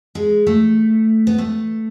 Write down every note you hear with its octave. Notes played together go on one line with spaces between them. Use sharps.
G#3
A3
B3
A3